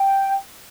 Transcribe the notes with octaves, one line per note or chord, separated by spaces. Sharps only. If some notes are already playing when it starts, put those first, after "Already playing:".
Already playing: G5